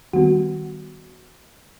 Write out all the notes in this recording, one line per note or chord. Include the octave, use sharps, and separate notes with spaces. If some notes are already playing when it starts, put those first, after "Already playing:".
D#3 G3 B3 F#4